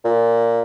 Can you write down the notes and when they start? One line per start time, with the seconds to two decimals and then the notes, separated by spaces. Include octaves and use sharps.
0.04 A#2